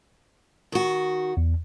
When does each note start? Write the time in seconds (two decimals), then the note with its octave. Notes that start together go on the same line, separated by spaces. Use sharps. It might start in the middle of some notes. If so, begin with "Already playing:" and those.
0.72 D#3 F#4
1.37 E2